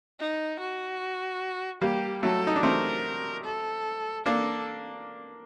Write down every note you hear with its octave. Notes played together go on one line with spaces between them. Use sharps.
D#4
F#4
G3 A#3 G4
F#3 A3 A4
D#4
D4
A3 C4 A#4
A4
A#3 D4 A4